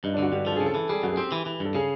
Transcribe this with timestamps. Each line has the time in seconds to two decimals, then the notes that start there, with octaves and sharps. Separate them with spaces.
0.03 G2 D#4
0.14 D4
0.18 D3 F#4
0.32 G2 G4
0.47 F3 A4
0.56 C#3 G#4
0.66 A4
0.75 E3
0.89 G3 G#4
1.03 F#2 F#4
1.13 G#4
1.17 C4 G4
1.32 E3
1.46 E3
1.60 G2
1.65 A4
1.75 C#3 G#4